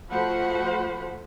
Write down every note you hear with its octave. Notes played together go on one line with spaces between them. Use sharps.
F3 A3 F#4 C5 F#5 B5